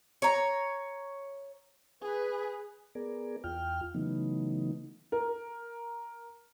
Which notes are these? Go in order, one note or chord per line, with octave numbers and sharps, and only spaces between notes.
C#5 A#5
G#4 B4
B3 G#4 A#4 D5
E2 F4 G5 F6
C#3 E3 F#3 A3 B3 D#4
A#4